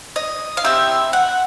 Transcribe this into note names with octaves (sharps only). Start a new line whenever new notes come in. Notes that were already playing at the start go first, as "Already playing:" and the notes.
D#5
F5
C4 E4 G4 E5
F#5